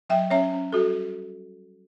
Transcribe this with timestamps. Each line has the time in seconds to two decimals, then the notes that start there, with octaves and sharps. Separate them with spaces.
0.09 F#3 E5 G5
0.30 C#4 C#5 E5
0.53 C#4
0.72 G3 F#4 A4